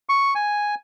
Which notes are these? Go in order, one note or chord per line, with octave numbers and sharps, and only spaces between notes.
C#6
G#5